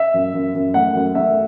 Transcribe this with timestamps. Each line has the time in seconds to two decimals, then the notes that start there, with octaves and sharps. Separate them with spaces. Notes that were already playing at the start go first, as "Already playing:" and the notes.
Already playing: E5
0.14 F#2
0.34 F#2
0.55 F#2
0.74 A3 F#5
0.95 F#2
1.15 A3 E5